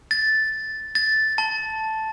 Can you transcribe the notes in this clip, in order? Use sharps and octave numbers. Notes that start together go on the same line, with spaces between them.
A6
A6
A5